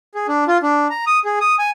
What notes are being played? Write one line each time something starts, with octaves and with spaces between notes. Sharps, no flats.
G#4
D4
F4
D4
A#5
D#6
G#4
D#6
G#5